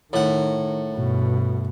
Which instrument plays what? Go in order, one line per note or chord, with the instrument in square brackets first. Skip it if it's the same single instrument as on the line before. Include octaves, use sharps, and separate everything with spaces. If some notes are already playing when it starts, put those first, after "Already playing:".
[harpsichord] A2 F#5 [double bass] D#3
[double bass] G2 B2